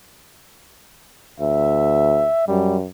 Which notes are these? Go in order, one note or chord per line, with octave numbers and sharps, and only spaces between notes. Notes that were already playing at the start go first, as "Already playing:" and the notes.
D2 E5
F#2 G3